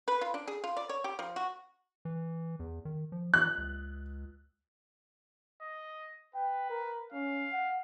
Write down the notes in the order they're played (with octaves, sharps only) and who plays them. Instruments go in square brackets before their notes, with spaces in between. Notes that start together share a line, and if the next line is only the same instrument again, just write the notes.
[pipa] B4
F4
D4
G#4
F4
D5
C#5
G4
F3
F#4
[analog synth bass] E3
E2
D#3
F3
[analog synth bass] E3 [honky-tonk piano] F#6
[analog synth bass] C#2
[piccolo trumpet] D#5
[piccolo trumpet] B4 [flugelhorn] G5
[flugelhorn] A#4
[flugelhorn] C#4 [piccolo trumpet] F5
[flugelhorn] F#5